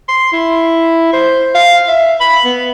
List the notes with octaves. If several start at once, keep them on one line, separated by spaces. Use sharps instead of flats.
C6
E4
C5
F5
E5
B5
B3